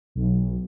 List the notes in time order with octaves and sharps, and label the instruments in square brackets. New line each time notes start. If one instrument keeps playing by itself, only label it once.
[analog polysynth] B1